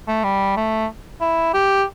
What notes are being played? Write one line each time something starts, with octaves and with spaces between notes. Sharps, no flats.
A3
G3
A3
E4
G4